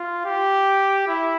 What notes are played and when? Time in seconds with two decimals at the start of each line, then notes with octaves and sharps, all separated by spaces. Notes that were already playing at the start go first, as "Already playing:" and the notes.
Already playing: F4
0.25 G4
1.08 E4